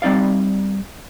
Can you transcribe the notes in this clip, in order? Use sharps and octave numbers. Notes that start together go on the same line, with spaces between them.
G3 C4 D#4 D5 F5